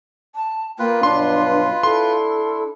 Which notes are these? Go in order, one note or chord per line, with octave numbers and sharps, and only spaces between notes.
A5
A#3 F4 B4 G5
G2 B2 F#3 D4 C6
D4 E4 A4 C6